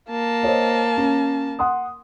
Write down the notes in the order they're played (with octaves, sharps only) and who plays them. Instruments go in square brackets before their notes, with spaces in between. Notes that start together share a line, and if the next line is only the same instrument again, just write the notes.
[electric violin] A#3 A5
[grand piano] C5 C#5 D#5
C#4
F#5 C6 D#6